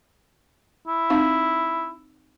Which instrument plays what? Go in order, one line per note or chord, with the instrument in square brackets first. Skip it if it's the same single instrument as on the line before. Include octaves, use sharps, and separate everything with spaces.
[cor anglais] E4
[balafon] C4 D#4 F5